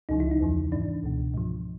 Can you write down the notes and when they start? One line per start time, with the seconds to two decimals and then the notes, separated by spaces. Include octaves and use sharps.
0.09 C#2 C#3 F3 D#4
0.20 E4
0.31 D#4
0.40 E2 C#3 F3
0.72 G#2 E3 D4
1.03 C#2 B2
1.34 G#2 F3